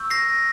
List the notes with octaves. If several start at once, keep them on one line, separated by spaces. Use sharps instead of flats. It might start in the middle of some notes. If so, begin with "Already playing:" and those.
Already playing: C#6 E6 G6
A#6 C7